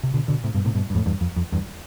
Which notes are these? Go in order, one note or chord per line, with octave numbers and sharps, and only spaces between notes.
C3
B2 D3
B2 D3
A2 C3
G2 B2
A2 C3
G2 B2
G2
F2 A2
E2 G2
F2
F2
E2 G2